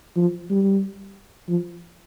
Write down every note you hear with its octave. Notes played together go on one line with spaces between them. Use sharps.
F3
G3
F3